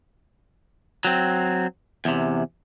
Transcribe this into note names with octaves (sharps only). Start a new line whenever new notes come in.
F#3 C4
E2 C3